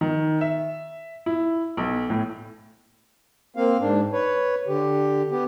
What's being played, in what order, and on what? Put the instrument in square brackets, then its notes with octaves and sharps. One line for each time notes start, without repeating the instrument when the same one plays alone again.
[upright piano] D#3
E5
E4
B1
A2
[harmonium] A#3 C4 F5
G#2 D4
B4 C#5
D3 G4
B3 G4